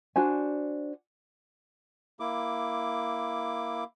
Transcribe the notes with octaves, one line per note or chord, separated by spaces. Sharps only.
D4 F#4 C5 G#5
A#3 E4 D6